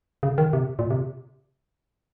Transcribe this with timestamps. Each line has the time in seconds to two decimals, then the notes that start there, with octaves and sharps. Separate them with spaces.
0.23 C#3
0.38 D#3
0.53 C3
0.79 A#2
0.90 C3